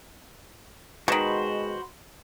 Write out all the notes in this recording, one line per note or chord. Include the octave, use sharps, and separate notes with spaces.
B2 D#3 G#3 F#4 C5 B5